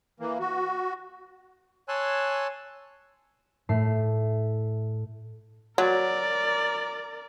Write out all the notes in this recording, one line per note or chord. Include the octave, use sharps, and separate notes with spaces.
E3 A#3
F#4
C#5 G#5 A5 C6 E6 F#6
A2 A3 C7
F#3 A#4 D5